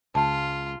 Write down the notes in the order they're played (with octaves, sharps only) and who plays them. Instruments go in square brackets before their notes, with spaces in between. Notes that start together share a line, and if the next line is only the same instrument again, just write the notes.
[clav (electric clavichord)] C#2 [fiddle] F4 [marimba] A5